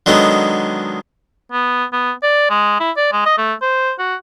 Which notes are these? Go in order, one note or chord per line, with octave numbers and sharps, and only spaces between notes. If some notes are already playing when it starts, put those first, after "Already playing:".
D3 D#3 F#3 G#3 B3
B3
B3
D5
G#3
E4
D5
G#3
D#5
A3
C5
F#4